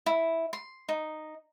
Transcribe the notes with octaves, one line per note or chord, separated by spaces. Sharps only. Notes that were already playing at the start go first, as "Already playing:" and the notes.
E4
C6
D#4